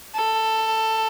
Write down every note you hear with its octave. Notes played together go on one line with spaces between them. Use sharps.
A4